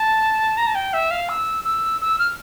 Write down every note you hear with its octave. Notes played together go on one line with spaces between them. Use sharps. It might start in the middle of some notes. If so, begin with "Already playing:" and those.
Already playing: A5
A#5
A5
G5
E5
F5
E6
E6
E6
F6